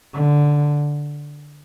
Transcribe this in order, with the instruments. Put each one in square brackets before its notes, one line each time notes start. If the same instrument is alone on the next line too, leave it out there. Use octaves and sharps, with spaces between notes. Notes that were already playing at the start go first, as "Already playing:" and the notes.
[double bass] D3